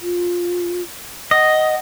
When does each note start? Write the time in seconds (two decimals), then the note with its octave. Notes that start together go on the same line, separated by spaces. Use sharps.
0.02 F4
1.31 D#5 F#5